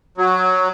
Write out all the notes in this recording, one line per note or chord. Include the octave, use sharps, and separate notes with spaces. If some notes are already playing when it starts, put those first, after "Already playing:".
F#3